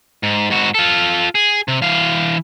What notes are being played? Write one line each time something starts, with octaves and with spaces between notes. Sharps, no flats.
G#2
G#2 F#4
F4 A4
G#4
C3
E3 F5